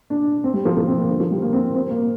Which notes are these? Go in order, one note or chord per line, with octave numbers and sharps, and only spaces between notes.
D4
C4
G3
F3
F3
C4
A#3
D3
F3
G3
A#3
C4
C4
C4
A#3